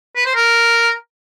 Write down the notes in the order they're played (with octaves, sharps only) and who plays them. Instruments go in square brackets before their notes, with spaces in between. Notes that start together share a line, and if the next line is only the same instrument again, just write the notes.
[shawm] B4
C5
A#4